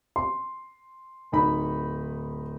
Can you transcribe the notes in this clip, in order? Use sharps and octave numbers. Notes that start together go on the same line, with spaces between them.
C6
D1 D#4 B5